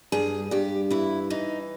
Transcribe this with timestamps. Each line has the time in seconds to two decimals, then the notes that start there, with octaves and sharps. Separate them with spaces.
0.12 G2 G#4
0.51 G2 G4
0.90 E3 E4
1.30 E3 D#4